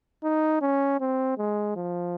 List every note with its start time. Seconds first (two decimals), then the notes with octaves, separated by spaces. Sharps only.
0.24 D#4
0.61 C#4
1.00 C4
1.38 G#3
1.76 F3